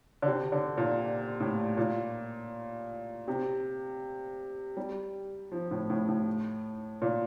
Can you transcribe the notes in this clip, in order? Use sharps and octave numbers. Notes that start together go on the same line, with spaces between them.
D3
C3
D3
A#2
A2
A#2
C3
G3
F3
A2
A2
A2
A#2